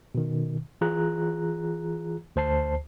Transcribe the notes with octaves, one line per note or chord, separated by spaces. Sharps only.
B2 D#3
E3 F4 G#4 A#5 F#6
D2 C5 A5 C7